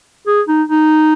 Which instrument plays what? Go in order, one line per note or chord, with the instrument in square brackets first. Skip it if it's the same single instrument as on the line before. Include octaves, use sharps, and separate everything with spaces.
[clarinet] G#4
D#4
D#4